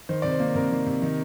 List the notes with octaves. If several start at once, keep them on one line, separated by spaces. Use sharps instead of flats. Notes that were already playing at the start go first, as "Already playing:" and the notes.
D#3 C5
C3 D5
C5
A#3
C3 A#4
D#3
C3
D#3